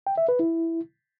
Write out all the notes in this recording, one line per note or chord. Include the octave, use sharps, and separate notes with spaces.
G5
E5
B4
E4